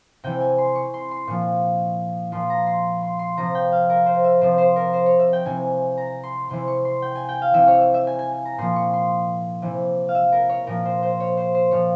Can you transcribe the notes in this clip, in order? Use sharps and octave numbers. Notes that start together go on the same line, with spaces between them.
C3 E3 G5
G#5
C6
C#6
C6
C6
A#2 F3 C#6
A#2 F3 C6
A#5
C6
C6
C6
C3 F3 A#5
G5
F5
A#4
C5
E5
C3 F3 C5
C5
A#4
C5
C#5
E5
G5
C3 E3 G#5
A#5
C6
C3 E3 C6
C#6
C6
G5
G#5
G5
F5
C3 E3 E5
C#5
E5
E5
G#5
G#5
G#5
A#5
A#2 F3 C6
C#6
C6
C3 E3
F5
E5
A#4
C#5
A#2 F3 A#4
C5
C5
C#5
C5
C5
A#2 F3 C#5